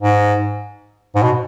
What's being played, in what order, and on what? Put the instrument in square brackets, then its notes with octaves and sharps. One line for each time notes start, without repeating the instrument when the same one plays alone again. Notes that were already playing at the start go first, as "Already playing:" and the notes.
[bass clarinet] G#2
G#2
B2